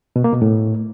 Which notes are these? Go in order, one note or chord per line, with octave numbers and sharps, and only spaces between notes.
B2
A#3
B2
A2